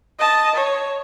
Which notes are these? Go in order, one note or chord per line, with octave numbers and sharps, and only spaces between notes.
D#5 A5
C#5